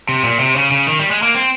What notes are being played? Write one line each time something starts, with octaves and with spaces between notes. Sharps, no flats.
C3
A#2
C3
C#3
C#3
D#3
G3
G#3
A#3
C4